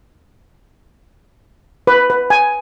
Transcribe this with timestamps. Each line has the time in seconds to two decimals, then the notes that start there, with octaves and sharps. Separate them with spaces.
1.87 B4
2.10 B4
2.30 G#5